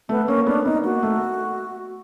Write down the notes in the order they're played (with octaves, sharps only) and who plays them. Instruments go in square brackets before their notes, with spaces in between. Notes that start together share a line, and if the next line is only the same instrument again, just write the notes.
[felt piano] A3 [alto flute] B3
[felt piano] A#3 [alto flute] C#4
[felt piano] B3 [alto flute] D4
[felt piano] B3 [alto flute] D#4
[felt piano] A#3 [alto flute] F#4
[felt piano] A3